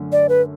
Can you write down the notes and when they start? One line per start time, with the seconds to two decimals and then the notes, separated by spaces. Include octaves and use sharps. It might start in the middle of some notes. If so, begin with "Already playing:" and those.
Already playing: F#2 D3 A3
0.12 D5
0.29 B4